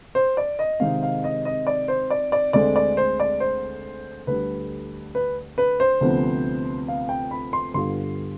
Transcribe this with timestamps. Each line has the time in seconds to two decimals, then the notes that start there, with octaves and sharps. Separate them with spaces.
0.15 C5
0.37 D5
0.59 D#5
0.80 C3 D#3 G#3 C4 D#4 F5
1.03 F5
1.24 D#5
1.45 D#5
1.67 D5
1.88 C5
2.10 D5
2.32 D5
2.53 D2 D3 G#3 C4 D5
2.76 D5
2.97 C5
3.20 D5
3.40 C5
4.27 D2 D3 G3 B4
5.15 B4
5.58 B4
5.80 C5
6.01 D2 C3 F3 B3
6.88 F5
7.09 G5
7.31 B5
7.53 C6
7.74 G2 D3 G3 B3 F4 C6